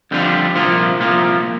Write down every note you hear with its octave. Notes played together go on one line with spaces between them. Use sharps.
F2 D3 G3 D4 F4
C2 A#2 F3 A#3 F4
C2 A#2 F3 A#3 F4